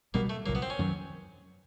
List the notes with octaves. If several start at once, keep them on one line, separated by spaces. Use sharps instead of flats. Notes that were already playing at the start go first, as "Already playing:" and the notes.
C#2 B2 G3 A#3 B3
A3
C2 A#2 F#3 A#3
B3
C4
C#4
F#2 D#3 F#3